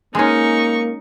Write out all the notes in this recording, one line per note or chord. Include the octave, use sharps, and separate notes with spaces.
G#3 A#3 C#4 D#4 C#6